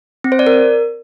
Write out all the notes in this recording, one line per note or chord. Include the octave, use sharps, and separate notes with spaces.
C4
C5
D5
A#4